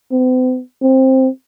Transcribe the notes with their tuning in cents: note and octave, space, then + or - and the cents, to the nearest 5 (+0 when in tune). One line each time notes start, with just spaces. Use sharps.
C4 -45
C4 +10